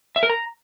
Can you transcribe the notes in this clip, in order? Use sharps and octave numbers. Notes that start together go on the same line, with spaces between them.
E5
A#4
A#5